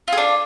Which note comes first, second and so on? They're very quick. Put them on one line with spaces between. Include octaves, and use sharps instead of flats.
F4 G#4 D4